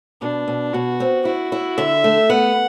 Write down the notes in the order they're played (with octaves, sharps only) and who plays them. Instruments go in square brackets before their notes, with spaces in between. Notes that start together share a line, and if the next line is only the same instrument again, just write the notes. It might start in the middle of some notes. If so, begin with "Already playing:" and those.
[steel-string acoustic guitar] B2 [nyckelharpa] D4
[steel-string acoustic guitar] B2
[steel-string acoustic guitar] B2 [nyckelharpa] F#4
[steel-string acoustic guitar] C4
[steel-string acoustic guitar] E4 [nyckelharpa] F#4
[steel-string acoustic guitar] E4
[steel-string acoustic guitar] D3 [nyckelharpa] E5
[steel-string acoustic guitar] A3
[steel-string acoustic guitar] B3 [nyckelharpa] F#5